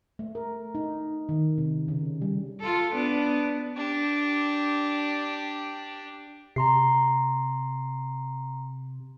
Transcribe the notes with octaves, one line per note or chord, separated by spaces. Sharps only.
A3
A#4
D#4
D#3
C3
C#3
G3
F4 A4
B3 D4
D4 G4
C3 A#5 C6 C7